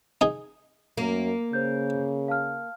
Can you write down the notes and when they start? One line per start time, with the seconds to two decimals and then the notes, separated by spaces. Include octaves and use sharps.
0.21 D#4 G#4
0.97 F#2 A#3
1.53 C#3 C5 G6
2.28 F5 A5 F6